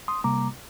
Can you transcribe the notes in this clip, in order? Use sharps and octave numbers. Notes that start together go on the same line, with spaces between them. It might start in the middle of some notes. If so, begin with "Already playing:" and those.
C6 D#6
C3 G3 A#3 A#5 D6